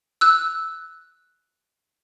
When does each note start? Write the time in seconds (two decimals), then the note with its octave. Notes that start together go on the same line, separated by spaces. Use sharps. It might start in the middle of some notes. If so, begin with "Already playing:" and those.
0.21 E6 F#6